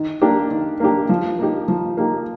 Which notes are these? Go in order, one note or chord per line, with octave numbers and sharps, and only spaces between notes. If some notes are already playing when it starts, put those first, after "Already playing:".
Already playing: D#3
A#3 D4 G4
D#3
A#3 D4 G4
F3
A#3 D#4 G4
F3
A#3 D#4 G4